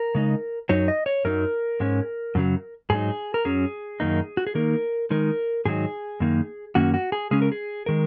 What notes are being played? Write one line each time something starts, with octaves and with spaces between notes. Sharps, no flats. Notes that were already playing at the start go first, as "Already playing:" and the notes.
Already playing: A#4
C#3 G#3 D#4
F#2 F#3 D#4 C#5
D#5
C#5
F#2 F#3 D#4 A#4
G#2 G#3 C#4
F#2 C#3 F#3
G#2 F#3 D#4 G#4
A#4
F#2 F#3 C#4 G#4
F#2 D#3 A#3 D#4
F#4
G#4
D#3 A#3 D#4 A#4
D#3 G#3 D#4 A#4
G#2 D#3 F#3 D#4 G#4
F#2 D#3 A#3 D#4
F#2 D#3 A#3 C#4 F#4
F#4
G#4
C#3 G#3 C#4 G#4
A#4
G#4
D#3 G#3 A#4